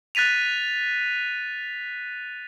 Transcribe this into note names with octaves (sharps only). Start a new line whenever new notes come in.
F#6 A6 B6 D#7 F7